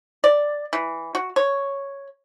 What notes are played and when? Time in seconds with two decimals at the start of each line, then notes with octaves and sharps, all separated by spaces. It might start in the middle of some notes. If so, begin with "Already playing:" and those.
0.24 D5
0.73 E3
1.15 F#4
1.36 C#5